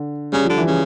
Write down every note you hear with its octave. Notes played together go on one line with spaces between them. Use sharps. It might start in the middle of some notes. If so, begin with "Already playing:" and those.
Already playing: D3
C#3 G3
D3 F3
E3
C#3